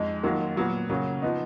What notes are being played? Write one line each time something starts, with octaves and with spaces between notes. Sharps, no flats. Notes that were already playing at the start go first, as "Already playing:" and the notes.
Already playing: F2 G#3 D#4
D#3 F#3 A#3 F4
A#2 F#3 B3
C#3 F#3 A#3 C#4
F3 B3 D#4